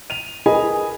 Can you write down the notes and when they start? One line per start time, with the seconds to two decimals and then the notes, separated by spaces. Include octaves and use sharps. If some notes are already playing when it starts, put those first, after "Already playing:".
0.10 D#7 F7
0.46 G#4 A#4 B4 D#5 G#5 B5